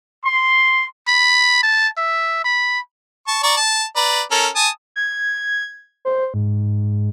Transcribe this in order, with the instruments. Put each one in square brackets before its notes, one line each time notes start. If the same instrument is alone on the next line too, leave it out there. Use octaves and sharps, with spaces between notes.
[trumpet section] C6
[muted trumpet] B5
A5
E5
B5
[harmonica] A5 C#6
D5 A#5 C#6
A5
B4 D5 A#5
C#4 A4 A#4
G#5 A5 D#6
[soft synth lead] G#6
C5
G#2